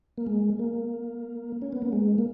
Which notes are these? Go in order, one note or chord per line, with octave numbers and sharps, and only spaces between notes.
A#3
G#3
A#3
C#4
B3
A#3
G#3
A#3